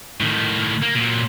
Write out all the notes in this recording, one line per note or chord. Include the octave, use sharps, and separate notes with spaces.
A2 D#3
A#3
A#2 F#3